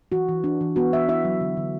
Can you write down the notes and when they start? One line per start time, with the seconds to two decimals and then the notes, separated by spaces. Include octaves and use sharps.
0.12 E3 F#4
0.28 E3
0.44 D4
0.61 E3
0.76 B3 F#4
0.93 E3 E5
1.09 E4 E5
1.25 F#3
1.41 D3
1.57 D3